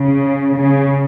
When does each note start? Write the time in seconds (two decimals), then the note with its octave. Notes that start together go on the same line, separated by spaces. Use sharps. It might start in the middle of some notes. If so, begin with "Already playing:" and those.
Already playing: C#3
0.56 C#3